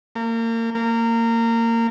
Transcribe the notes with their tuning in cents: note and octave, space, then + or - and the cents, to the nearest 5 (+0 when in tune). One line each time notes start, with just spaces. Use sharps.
A#3 -30
A#3 -20